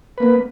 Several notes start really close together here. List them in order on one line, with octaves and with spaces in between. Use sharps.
B4 A#3 B3